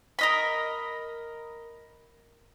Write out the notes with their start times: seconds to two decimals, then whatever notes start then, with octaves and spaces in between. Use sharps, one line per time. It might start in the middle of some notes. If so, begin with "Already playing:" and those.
0.19 A#4 D#5 B5